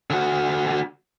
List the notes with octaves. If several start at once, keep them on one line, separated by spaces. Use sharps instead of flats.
D3 F#4